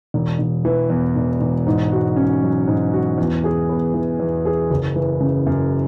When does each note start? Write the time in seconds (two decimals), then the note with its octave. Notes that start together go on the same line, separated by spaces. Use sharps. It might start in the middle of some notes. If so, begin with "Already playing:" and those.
0.14 E1
0.39 E1
0.65 E3
0.90 E2
1.16 E1
1.40 E1
1.67 G#2
1.92 F#4
2.16 C#4
2.42 F#3
2.68 G#2
2.94 F#4
3.18 E2
3.44 G#4
3.69 B3
3.94 E3
4.20 E2
4.45 G#4
4.71 F#1
4.96 E3
5.21 C#3
5.46 F#2